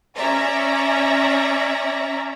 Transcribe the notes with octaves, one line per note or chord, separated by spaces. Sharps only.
C#4 D5 E5 A#5 A#6